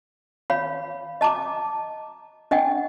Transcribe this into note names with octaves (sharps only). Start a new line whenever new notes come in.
C#5 F5 B5
D#5 A5 A#5 D6
D4 D#5 F#5 G5